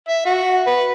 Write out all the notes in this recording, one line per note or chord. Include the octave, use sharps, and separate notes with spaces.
E5
F#4
B4